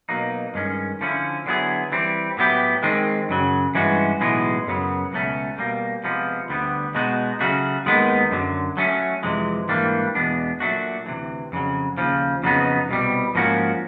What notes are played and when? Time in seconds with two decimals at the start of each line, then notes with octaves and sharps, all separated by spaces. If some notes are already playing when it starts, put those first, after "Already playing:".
0.09 B2 F#3 A#3 D#4
0.54 G2 D#3 G#3 C#4
1.01 D3 F3 A3 C#4 E4
1.46 D3 F#3 B3 E4 G#4
1.92 E3 G3 C4
2.37 A2 F#3 B3 E4 G4
2.83 D#3 G#3 C4
3.29 F#2 C#3 F#3
3.75 G2 E3 G#3 C#4 F#4
4.20 B1 A2 E3 G#3 B3
4.66 F#2 C#3 F#3 B3
5.12 C#2 B2 F#3 A3 C#4
5.58 B2 G3 A#3
6.04 C3 F3 G#3 B3
6.49 D2 D3 G3 B3
6.95 B2 G#3 B3 D#4 F#4
7.40 C#3 F#3 A3 C#4 F#4
7.86 D#2 D#3 G#3 B3 D#4
8.31 F#2 D3 F#3
8.77 F#3 A3 C#4
9.23 F2 C3 E3 G#3
9.68 G#2 E3 G3 A#3 D4
10.15 E2 B2 G#3 B3 D4
10.60 A#2 F#3 A3 D4 F#4
11.06 D2 C3 E3
11.52 F2 C#3 F#3
11.98 D#2 C#3 F3
12.43 F2 C#3 F#3 B3 D#4
12.89 C2 B2 G3
13.35 G#2 F3 A#3 C#4 F#4